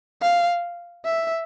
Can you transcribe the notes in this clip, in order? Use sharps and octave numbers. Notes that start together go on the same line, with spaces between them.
F5
E5